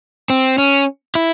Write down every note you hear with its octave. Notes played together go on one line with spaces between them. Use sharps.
C4
C#4
E4